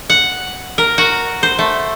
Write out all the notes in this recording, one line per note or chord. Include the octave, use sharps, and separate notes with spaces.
F#5
A#4
F#4
C5
A3